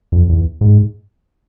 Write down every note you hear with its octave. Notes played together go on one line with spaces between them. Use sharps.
F2
E2
G#2